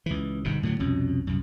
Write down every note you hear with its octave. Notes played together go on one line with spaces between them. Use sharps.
C#2 E3
G1 G#2 B2
A2 D3 D#3 F#3
C2 F2 B2 C#4
C2 F#2